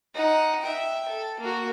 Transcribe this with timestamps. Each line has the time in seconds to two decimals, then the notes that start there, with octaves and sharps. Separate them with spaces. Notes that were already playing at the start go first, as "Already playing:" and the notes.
0.15 D#4 F#5
0.61 E5 G5
1.09 A4
1.40 A#3 F#4